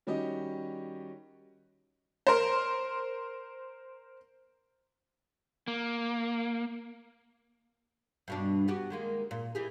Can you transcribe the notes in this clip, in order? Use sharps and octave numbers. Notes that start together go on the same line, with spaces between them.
D#3 G3 C#4 F#4 G4 D#5
A#4 C5
A#3
G2 B2 D4
B3 F#4 G4
D#3 G#3 A#3
A#2
E3 G4 G#4